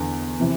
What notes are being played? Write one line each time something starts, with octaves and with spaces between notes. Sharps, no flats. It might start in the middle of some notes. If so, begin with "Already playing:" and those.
Already playing: E2 D3
C3 E3